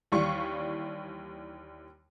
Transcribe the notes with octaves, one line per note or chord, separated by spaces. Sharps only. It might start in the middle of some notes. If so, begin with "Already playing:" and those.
D#2 E3 G3 F5 C#6